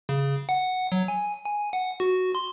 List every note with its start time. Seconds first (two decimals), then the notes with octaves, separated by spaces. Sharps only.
0.09 C#3
0.49 F#5
0.92 F#3
1.08 G#5
1.45 G#5
1.73 F#5
2.00 F#4
2.35 C6